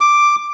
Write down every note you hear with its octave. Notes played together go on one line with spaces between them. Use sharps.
D6